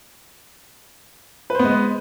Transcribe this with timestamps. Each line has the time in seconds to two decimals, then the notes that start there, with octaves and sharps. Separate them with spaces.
1.50 B4
1.55 C5
1.59 B3
1.64 G#3